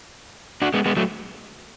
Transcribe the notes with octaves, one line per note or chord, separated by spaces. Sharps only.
D4 F#4
G#3 B3
G#3 B3
F#3 A3